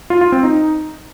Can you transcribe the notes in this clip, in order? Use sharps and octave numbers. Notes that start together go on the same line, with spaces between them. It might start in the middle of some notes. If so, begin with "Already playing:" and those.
F4
F4
C4
D#4